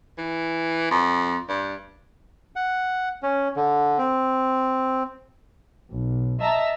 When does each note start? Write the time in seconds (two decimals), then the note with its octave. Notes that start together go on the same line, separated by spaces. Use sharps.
0.18 E3
0.91 F2
1.49 G2
2.56 F#5
3.23 C#4
3.56 D3
3.98 C4
5.90 B1
6.40 D#5 E5 A5 A#5